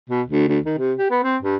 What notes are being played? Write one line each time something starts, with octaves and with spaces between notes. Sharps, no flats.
B2
D2
D2
D#3
C3
G4
B3
C4
G2